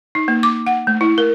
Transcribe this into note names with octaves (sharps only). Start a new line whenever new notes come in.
D#4
A#3
D6
F#5
A3
E4
A#4